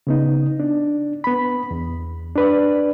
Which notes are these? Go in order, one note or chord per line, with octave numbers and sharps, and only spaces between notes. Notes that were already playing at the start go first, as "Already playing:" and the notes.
C#3 B3 D#4
D4
B3 B5
E2
D4 B4 D5